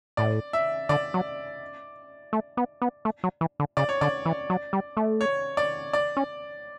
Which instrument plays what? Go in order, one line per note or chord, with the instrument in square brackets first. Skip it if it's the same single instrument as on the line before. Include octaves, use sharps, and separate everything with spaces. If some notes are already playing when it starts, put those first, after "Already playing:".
[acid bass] A2 [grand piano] D5
[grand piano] E5
[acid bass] D3 [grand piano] D5
[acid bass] F#3
A3
B3
B3
A3
F#3
E3
D3
[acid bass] C#3 [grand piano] D5
[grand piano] C#5
[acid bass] D3 [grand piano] D5
[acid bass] E3
F#3
G3
A3
[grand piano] C#5
D5
D5
[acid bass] C#4